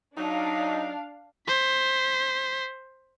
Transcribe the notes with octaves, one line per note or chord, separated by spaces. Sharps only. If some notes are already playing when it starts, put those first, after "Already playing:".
F#3 D4 D#4 F5
C5 B6